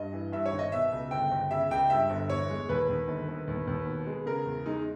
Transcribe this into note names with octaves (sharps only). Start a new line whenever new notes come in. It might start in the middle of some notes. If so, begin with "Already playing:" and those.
Already playing: G2 D#5
E3
G2 E5
C#5
G#1
D#5
B2 E5
C#2
G1 G5
G1
C#3 E5
C#2 G5
G2 E5
G1
E2 C#5
G#3
D#2 B4
D#2
G1
G1
D#2
D#2
B2
G#3
C#3 A#4
E2
G#3 D#4